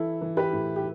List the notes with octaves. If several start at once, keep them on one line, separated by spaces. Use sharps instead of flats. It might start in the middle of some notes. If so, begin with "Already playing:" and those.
Already playing: E3 E4 A4
E3
G4 B4
A2
G4